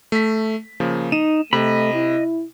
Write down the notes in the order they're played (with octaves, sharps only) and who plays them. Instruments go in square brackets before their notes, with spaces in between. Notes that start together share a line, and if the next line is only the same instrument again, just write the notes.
[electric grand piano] A3 B6
C#3 F3 A#3
[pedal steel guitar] D#4 [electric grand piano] D#7 E7
[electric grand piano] C3 [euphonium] A3 [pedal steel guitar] D#5 B5
[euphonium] E4